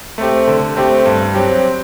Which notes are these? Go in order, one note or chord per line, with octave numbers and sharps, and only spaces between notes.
A3 C4 G4
D3
A3 C4 G4
G2
F#3 C4 G4